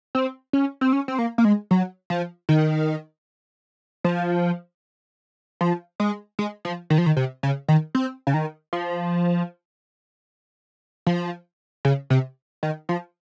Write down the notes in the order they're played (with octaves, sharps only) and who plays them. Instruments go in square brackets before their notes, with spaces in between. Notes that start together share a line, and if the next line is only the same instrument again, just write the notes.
[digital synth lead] C4
C#4
C4
C#4
C4
A#3
A#3
G#3
F#3
F3
D#3
F3
F3
G#3
G#3
F3
D#3
F3
D#3
C3
C#3
D#3
C4
C#3
D#3
F3
F3
C#3
C3
D#3
F3